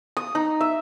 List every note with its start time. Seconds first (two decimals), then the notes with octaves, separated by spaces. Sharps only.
0.17 D#6
0.35 D#4
0.60 E5